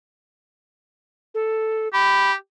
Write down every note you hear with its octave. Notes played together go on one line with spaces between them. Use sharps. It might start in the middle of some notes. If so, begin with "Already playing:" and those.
A4
G4 B5